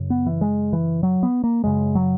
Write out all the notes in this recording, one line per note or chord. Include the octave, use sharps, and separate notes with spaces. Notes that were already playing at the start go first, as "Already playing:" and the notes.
Already playing: F#2 C#3
B3
E3
G#3
E3
F#3
B3
A#3
F#2 C#3 G#3
F#3